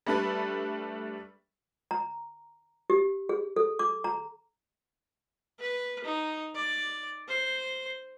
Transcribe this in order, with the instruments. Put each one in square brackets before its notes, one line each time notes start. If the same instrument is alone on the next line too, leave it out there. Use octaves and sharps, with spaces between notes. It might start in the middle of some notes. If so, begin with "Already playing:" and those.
[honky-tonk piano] G3 A3 D4 A4 B4
[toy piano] A#5
G4
G#4
A4
D6
A#5
[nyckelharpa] B4
D#4
D5
C5